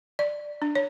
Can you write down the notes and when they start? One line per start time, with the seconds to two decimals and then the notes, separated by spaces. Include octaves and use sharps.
0.19 D5
0.62 D4
0.75 C#5